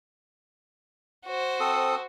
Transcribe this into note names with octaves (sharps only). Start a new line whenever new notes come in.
F#4 C5
C4 A4 D#6